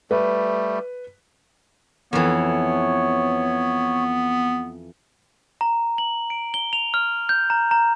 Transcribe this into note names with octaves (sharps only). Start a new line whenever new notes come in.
G3 A3 B4
F2 E3 B3 C#5
A#5
F#7
D7
G7
F7
F6
G6
A#5
A#5